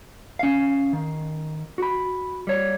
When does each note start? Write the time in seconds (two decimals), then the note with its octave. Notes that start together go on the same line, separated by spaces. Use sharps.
0.39 C#4 F5
0.93 D#3
1.78 F#4 B5
2.47 G3 C#5